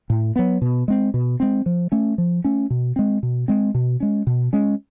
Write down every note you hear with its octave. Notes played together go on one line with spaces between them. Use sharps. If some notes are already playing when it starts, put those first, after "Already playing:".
A2
F#3 B3
B2
G#3 C4
B2
G#3 C4
F3
A3 C#4
F3
A3 C#4
B2
G#3 C4
B2
G#3 C4
B2
G#3 C#4
B2
G#3 C#4